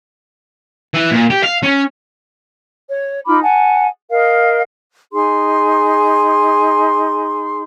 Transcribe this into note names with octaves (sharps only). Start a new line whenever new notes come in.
E3
A#2
G4
F5
C#4
C#5
D#4 F4 B5 D6
F#5 G#5 A5
A#4 D#5 F5
D#4 G#4 C6